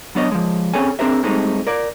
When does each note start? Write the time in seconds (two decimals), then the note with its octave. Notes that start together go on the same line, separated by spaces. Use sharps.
0.15 F#3 B3 D4 C#5 D#5
0.32 F3 G#3
0.74 C4 C#4 G#4 A4 C#5 G#5
0.99 C4 D4 G#4 A#4 C5 E5
1.23 G2 G#3 A3 C4 D#4
1.67 A#4 D5